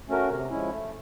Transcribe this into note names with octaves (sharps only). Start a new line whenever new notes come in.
A3 C#4 F#4 A#4
C3
F3 G#3 C#4 E4
A3